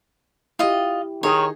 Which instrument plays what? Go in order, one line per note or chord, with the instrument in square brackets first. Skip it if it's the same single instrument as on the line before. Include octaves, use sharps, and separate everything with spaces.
[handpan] E4 G4 [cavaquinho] F4 D#5
[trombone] D#3 [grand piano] D#4 G#4 D#6 [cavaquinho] C#5